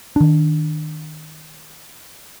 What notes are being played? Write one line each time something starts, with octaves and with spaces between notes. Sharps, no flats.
D#3 D4